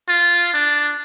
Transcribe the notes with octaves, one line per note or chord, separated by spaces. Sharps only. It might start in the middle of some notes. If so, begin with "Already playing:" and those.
F4
D4